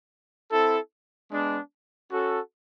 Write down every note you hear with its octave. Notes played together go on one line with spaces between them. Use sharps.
C4 E4 A4
G#3 B3 D4
C#4 F#4 A4